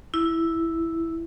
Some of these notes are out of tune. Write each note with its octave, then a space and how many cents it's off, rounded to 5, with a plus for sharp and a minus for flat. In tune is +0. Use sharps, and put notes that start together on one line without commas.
E4 +0